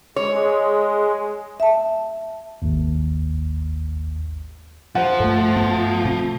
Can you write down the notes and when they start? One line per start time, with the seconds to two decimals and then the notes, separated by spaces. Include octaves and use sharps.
0.16 G#3 C#5
1.60 E5 A5
2.62 G#1 D#2
4.95 F3 F4 C5 F#5
5.20 G2 A3 A4
5.56 G2 B3
6.05 B2 C4